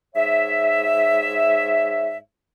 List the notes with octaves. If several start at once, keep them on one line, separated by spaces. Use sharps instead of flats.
G#2 C#5 E5